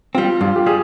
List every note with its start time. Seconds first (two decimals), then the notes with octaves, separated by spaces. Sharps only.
0.15 G3 C4 F4
0.41 G2 F4
0.56 G4
0.66 G3 G#4